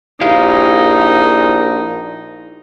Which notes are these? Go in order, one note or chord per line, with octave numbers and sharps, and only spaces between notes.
A#1 D#4 E4 G4 F5